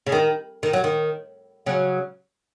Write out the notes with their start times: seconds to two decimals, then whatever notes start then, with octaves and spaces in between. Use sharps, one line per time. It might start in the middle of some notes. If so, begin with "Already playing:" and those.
0.07 C#3
0.12 D#3
0.63 D#3
0.73 F#3
0.84 D#3
1.66 C#3 F#3